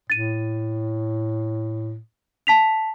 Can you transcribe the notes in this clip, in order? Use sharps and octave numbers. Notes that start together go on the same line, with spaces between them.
A2 A6 D#7
A5 B6 F7